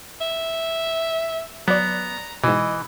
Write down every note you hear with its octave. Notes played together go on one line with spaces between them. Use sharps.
E5
F#3 B3 D5 A#5
G#2 B2 E3 D#5